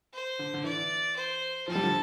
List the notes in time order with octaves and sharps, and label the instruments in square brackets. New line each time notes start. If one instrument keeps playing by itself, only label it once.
[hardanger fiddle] C5
[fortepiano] D3
D3
[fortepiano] E3 [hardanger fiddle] D5
[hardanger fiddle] C5
[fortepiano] F3 [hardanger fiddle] A4
[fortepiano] G3
D3 F3